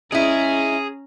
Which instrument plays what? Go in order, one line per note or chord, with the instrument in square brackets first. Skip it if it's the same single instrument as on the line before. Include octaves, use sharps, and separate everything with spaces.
[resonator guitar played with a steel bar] G#3 E4 [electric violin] C#4 A#5 [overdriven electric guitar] G#4